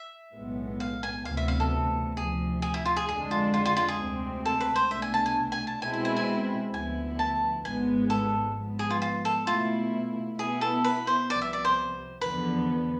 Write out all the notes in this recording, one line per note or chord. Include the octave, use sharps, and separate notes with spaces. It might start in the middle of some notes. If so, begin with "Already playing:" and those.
Already playing: E5
B1 A2 G#3 B3
F5
G#5
D2 C3 E3 B3 F5
E5
F5
A4
D2 C3 F3 G#4
G#4
E4
F4
G#4
F2 D3 G#3 D4 G#4
F4
F4
F4
F4
G#4
D2 C3 G#3 C4
A4
B4
C5
C2 B2 A3 D4 E5
G#5
A5
G#5
G#5
A5
B2 G#3 C4 E4 G#5
G#5
G#5
G#5
D2 D3 F3 B3 E4 G#5
A5
G#1 G#2 G#3 B3 G#5
A4
G#2 F3 B3
G#4
F4
F4
A4
B2 A3 E4 F4
B2 B3 E4 G#4
A4
B4
C5
C2 C3 F3 B3 D5
E5
D5
C5
E2 D3 F3 B3 B4